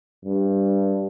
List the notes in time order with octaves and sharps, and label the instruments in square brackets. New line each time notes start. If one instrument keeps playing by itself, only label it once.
[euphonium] G2